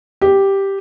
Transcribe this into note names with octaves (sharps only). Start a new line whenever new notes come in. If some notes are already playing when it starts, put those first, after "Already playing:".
G4